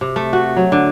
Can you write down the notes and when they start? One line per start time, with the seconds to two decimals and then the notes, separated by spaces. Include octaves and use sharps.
0.01 C3
0.16 A3
0.33 F#4
0.57 F#3
0.72 D3